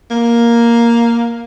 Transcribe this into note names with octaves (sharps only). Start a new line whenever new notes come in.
A#3